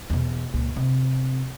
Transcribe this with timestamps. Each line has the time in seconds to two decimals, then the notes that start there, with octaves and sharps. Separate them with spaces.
0.10 E2 B2
0.54 C#2 A#2
0.76 C3